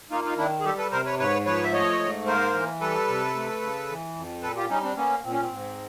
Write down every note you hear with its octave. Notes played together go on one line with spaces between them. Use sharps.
A#3 D#4 F4
D#4 F4
D#3 D4 E4
G#4
G3 G4 A4
A4 B4
C3 A#4 C5
B4 C#5
G#2 B4 C#5
F3 B4 C#5
E5
A3 C#5 D#5
G#2
A#3 A#4 C5
E3
G3 A4 B4
C3
A3
C#3
E3
F2
A#2 A4 B4
F4 G4
G3 C#4 D#4
C4 D4
A#3 B3 C#4
A#2 C4
C#4
C4
G#2